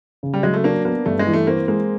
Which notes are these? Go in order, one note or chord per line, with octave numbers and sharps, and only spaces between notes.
C#3
G3
F#3 G#3
A3
A#3 D4
A#3 B3
G2 A3
G#3
E3
A3
A#3 C4
G#3 A#3